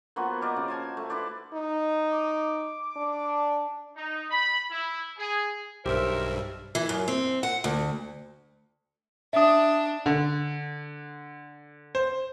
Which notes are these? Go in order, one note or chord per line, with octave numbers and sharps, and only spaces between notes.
F3 A#3 B3 F#4
A#4 C5 D5 D#5
C#3
C5 D#5 G#5 A5
A3
E4 B4 C5 D5
D#4
D6
D4
D#4
B5
E4
G#4
B1 G2 G4 A#4 C5 E5
E3
F#2
C4
F#5
D2
D4 E5 D#6
D3
C5